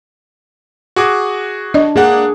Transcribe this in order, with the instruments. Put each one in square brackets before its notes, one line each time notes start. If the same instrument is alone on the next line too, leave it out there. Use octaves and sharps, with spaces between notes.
[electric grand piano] F#4 G#4 D6
[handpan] D4 [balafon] D5 D#5
[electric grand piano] A#3 D4 F#5 [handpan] G#4